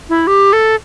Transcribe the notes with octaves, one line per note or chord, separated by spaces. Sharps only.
E4
G4
A4